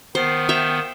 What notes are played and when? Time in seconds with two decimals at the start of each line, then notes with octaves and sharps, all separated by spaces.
0.15 D#3 B3 C5
0.49 E5 F5 G5